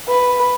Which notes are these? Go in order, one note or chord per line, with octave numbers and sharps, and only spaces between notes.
B4